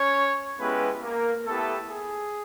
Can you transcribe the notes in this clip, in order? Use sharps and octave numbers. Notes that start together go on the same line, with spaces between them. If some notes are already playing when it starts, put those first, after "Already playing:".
Already playing: C#4 C#5
G#3 B3 C#4 E4 G4 B4
A#3 A#4
A3 B3 E4 G4 A4
G#4